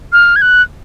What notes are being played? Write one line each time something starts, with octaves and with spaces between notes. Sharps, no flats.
F6
G#6
F#6